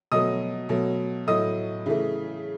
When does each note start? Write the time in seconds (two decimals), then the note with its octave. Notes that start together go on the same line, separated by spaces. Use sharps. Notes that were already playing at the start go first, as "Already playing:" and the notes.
0.12 B2 F#3 A3 D#5 D#6
0.69 B2 F#3 A3
1.27 A2 F#3 A3 D#5 D#6
1.86 C#3 E3 A3